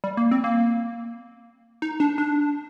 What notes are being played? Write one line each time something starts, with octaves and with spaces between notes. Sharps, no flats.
G3
A#3
C4
A#3
D#4
D4
D4